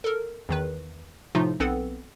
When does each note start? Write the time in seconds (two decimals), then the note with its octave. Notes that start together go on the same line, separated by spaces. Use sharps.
0.04 A4 A#4
0.49 E2 D#3 B4
1.35 A2 C3 F3 A3 D#4 F4
1.60 B1 B3 C4 A4 B4 F#5